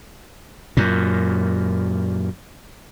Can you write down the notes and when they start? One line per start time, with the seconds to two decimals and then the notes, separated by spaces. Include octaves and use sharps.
0.77 F#2 A#2